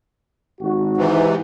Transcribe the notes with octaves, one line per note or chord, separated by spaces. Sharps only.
G#1 F#4
G#2 C3 E3